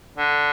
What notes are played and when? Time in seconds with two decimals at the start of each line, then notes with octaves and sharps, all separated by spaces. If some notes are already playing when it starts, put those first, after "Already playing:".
0.17 D3